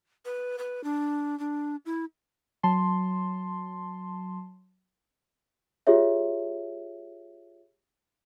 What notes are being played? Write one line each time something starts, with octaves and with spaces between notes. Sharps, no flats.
B4
B4
D4
D4
E4
F#3 A5 C6
F4 G4 G#4 C#5 E5